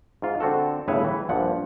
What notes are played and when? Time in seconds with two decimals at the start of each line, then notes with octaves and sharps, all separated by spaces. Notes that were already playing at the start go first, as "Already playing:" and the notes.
0.22 G#2 F4
0.40 D3 C4 F#4 A4
0.88 G1 A2 C#3 B4 C#5 E5
1.04 E3
1.29 A#1 G2 F3 F#5